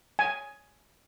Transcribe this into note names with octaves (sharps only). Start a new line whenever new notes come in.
G#5